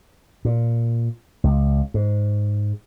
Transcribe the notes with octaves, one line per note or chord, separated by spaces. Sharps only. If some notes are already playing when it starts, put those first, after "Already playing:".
A#2
C#2
G#2